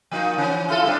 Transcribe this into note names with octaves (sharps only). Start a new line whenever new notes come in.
F3 A#3 D#4
E3 C#4
E4 F4 A4
G3 C4 D4